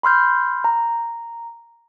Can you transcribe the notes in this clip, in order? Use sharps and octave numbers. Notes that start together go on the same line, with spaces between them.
B5 C6 F6 G6
A#5